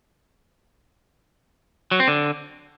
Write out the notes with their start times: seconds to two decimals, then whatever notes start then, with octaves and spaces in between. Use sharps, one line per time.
1.91 F#3
2.00 C4
2.08 D3